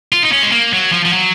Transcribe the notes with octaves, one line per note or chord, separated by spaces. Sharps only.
F4
D#4
C#4
G#3
A#3
F#3
F3
F3
F#3